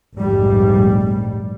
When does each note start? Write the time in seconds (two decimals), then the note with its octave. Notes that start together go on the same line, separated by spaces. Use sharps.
0.15 F1 A#1 G#2 G3